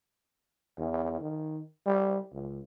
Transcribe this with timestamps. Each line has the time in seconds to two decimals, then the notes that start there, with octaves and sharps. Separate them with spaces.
0.78 E2
1.21 D#3
1.86 G3
2.32 C#2